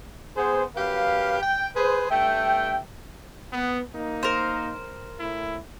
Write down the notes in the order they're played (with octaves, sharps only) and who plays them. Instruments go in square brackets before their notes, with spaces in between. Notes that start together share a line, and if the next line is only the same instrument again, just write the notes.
[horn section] B3 G#4 C5
F#2 G4 B4 F5
G5
G#4 B4 C5
G2 A3 E5 G5
B3
A#3 D#4
[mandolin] A#4 C5
[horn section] A2 E4